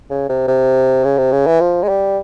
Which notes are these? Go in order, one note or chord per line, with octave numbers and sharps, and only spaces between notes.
C#3
C3
C3
C#3
C3
C#3
E3
F3
G#3
G3